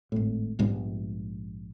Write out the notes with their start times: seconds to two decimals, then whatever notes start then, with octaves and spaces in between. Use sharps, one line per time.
0.12 G#1 A2
0.59 A#1 G#2 G3 B3